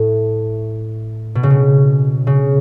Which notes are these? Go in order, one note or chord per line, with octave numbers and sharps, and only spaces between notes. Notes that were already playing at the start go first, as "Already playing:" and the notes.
Already playing: A2
B2
C#3
B2
C#3